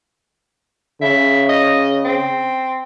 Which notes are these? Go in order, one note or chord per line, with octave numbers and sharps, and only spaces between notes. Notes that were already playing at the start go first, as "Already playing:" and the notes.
C#3 E5
D#5
C4